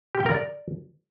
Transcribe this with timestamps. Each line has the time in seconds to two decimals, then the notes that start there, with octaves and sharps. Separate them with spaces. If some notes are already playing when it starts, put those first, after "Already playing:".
0.15 G4
0.20 G5
0.26 A#4
0.32 D5